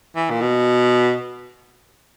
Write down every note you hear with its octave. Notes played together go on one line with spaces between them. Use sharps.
E3
A#2
B2